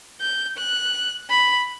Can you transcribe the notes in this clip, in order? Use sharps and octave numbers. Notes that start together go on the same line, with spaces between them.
G6
F#6
B5